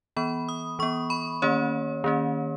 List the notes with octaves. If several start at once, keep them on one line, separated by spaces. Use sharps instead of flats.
E3 B3 B5
D#6
E3 B3 C#6
B5
D#3 A#3 C#4 C#5
D#3 A#3 C#4